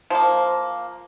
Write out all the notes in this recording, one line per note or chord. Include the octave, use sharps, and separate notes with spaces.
F3 A#3